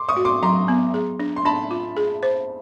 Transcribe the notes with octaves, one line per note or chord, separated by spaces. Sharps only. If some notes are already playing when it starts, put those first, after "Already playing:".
Already playing: C6 D6
C#6 D#6
F#4
C6 D6
F#3 A#5 C6
B3
G#4
D4
C6
D4 A5 B5
F4
G#4
C5